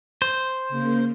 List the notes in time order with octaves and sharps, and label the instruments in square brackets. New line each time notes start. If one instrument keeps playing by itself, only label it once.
[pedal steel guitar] C5
[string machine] C#3 A#3